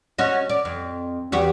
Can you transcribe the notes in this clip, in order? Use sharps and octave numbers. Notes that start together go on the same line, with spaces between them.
C#4 F#4 D#5
D5
F2
E2 F#4 G4